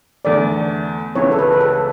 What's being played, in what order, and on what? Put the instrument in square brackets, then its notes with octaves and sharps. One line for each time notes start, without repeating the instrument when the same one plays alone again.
[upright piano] E2 D3 A3 [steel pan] D5
[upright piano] C#2 C#3 E3 B3 E4 [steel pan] C#5
[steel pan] A4
B4
B4
A4